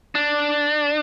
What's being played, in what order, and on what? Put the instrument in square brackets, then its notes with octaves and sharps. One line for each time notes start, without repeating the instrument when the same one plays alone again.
[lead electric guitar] D4